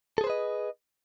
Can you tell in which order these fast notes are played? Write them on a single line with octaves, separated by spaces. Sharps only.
A4 G#4 C5 B4 D#5